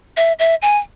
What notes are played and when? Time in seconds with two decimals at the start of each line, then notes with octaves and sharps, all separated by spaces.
0.17 E5
0.39 E5
0.62 G#5